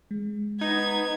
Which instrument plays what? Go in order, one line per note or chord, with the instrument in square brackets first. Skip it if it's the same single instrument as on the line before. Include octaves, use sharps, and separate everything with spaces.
[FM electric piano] G#3
[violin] B3 G#6 [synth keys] D#4